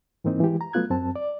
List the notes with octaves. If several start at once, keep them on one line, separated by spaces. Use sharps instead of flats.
G#2 E3 A#3 C4 D#4
E3 G#3 G4
A#5
F#3 A3 B3 F4 F#6 G#6
F#2 C4 A5
D5